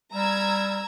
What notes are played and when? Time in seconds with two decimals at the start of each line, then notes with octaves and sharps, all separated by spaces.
0.14 G3 A#5 E6 G#6